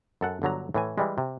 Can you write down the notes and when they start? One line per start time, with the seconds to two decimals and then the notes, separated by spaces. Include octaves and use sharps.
0.21 F#2 A4 F#5
0.42 G1 D3 F#3 A#5
0.74 A2 E3 G#5
0.98 E3 G3 G#3
1.18 C3